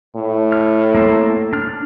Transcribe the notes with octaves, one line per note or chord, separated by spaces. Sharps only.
A2
F6
A#3 C4 A4
D4 F6